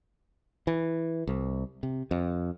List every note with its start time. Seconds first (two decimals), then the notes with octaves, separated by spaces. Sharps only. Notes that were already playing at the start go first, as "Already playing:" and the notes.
0.67 E3
1.27 C2
1.83 C3
2.11 F2